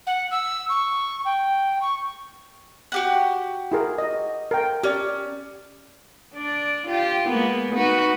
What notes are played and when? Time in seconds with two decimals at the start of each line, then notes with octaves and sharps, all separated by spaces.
0.07 F#5
0.31 E6
0.69 C#6
1.25 G5
1.81 C#6
2.92 F#4 G4 F#5
3.72 E4 G#4 A#4
3.98 D#5
4.51 A#4 G5
4.83 C#4 G4 D5
6.35 D4 D5
6.87 F4 G4
7.29 G#3 A#3 B3
7.76 D#4 F#4 B4